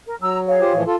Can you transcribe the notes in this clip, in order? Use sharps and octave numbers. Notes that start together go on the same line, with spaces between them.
A#4
F#3 A#5 E6
G#4 C#5 F5
F4 G4 C5
A2 E3 F3
F4 A4